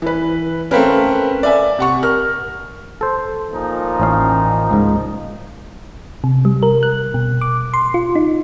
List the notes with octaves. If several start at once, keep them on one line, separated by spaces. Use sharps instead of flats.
E3 B4
A3 C4 C#4 A#4 B4 F5
D5 E5 G#5
C3 F#5 C#6
A#4 F6
A4 C5
A#2 F3 D#4
A1 C#4 F5
C#2 G#2
C3
G3
A#4
F#6
B2
D6
C6
F4
D#4